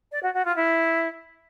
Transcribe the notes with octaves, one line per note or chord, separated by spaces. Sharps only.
D5
F#4
F#4
F4
E4